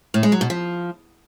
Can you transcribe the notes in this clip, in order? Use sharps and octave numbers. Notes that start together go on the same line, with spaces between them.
A2
G#3
F#3
B2
F3